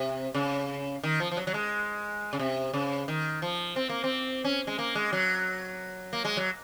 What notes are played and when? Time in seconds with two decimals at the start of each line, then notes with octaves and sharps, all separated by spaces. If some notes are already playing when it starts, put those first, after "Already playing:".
Already playing: C3
0.35 C#3
1.03 D#3
1.20 F3
1.32 F3
1.37 F#3
1.47 F#3
1.54 G#3
2.33 C#3
2.40 C3
2.74 C#3
3.08 D#3
3.42 F3
3.76 C4
3.89 A#3
4.04 C4
4.44 C#4
4.67 G#3
4.79 A#3
4.95 G#3
5.13 F#3
6.13 A#3
6.25 G#3
6.37 F#3